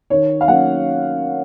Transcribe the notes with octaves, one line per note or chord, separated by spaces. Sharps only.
D#3 C#5
F5
F#3 A#3 C#4 F#5